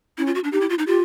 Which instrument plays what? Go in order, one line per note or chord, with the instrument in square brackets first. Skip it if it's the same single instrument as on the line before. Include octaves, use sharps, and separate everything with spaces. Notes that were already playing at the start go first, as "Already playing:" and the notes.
[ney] C#4 [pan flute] E4
[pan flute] F4
F#4
D4
[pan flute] D#4 [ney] G4
[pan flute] E4
F4
D#4
[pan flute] F4 [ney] G4